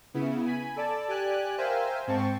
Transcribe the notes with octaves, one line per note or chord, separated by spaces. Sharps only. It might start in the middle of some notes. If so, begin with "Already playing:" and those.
C#3 B3 E4
G#5 B5
A4 D5 A5
G4 D5 G#5 F#6
A#4 C5 E5 F5 G5 G#5
G#2 C4 G5 A5 C#6